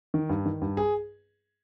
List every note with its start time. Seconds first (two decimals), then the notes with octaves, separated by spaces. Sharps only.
0.14 D#3
0.29 G2
0.46 D#3
0.61 G2
0.77 G#4